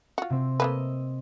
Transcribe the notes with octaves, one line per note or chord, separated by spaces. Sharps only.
F4 F#4
C3 C4
A3 A#3 B4 D#5 E6